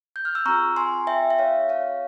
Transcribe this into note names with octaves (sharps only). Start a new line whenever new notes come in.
G6
F6
E6
C4 F4 G#4 A#5 C#6
G#5 C6
E5 G5
E5
C#5 F5
C#5 F5